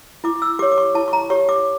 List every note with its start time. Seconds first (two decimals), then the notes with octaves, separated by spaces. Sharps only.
0.24 E4 D6
0.42 E6
0.59 G4 C#5 D6
0.72 D6
0.78 C#6
0.95 E4 A5
1.08 C#6
1.13 A#5
1.30 G4 C#5 C#6
1.49 D6